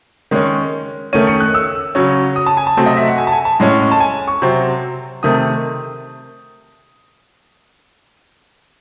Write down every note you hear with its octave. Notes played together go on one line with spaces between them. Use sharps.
D#3 G#3 C#4
D#3 A3 C#4 D#7
C#7
F#6
E6
C#3 F#3 C#4
D#6
A5
G#5
A5
C3 F#3 A3 C4
D#5
E5
F#5
G#5
A5
G#5
A5
A2 G#3 C#4
A5
G#5
C#6
C3 F#3 C4
C3 D#3 A3 D#6